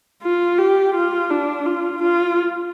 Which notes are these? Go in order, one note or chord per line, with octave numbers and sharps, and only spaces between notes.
F4
G4
F4
D4
F4
F4